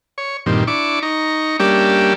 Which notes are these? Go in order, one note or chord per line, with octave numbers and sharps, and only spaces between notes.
C#5
G2 A#2 D#3 C4
D4 E4 C#6 D6
D#4 A#5 C#6
G3 A#3 C#4 D4 G4 E5